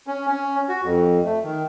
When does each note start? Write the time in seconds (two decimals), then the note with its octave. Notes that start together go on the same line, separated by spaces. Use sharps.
0.07 C#4
0.27 C#4
0.69 F#4
0.83 F2
1.25 A3
1.44 D#3